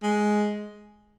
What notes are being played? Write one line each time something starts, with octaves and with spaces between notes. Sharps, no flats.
G#3